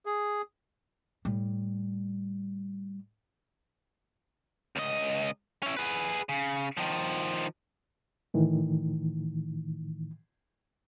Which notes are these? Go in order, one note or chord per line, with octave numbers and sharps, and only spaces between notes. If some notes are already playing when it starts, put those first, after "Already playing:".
G#4
A2 G3
C#2 D#5
C#4 E4
G#4 B4
C#3
D#3 F3
A2 D#3 E3